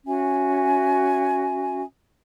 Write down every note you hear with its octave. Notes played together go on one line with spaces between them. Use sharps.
C#4 F#4 E5 G#5